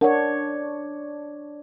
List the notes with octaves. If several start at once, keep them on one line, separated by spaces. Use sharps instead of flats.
D4 A#4 C#5 F#5